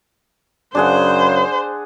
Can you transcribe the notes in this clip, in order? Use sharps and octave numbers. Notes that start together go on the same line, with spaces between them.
F#2 C#3 D4 G#4 C5 F#5